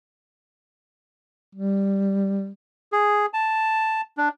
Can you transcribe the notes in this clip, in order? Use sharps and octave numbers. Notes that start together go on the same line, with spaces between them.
G3
G#4
A5
D4